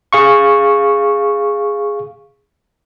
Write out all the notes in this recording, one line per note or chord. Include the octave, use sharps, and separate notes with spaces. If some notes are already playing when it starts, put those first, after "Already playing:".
G#4 F5 C#6